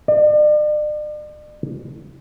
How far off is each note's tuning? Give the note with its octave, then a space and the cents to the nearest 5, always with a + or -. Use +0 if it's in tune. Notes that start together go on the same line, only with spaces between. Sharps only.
D5 +40